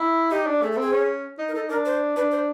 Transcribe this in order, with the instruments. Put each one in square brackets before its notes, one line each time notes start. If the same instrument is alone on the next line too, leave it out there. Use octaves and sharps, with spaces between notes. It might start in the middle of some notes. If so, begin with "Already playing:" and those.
Already playing: [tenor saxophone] E4
[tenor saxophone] D#4 [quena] G4
[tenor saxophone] D4
[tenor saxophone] A3 [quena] G#4
[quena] A4
[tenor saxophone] C4 [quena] G#4
[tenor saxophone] C#4
D#4
[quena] A#4
[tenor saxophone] D#4 [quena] A4
[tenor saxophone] D4 [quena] A#4
[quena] C5
[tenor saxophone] D4 [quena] B4
[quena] C5